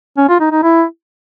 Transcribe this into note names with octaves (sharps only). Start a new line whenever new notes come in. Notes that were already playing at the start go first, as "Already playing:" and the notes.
C#4
F4
D#4
D#4
E4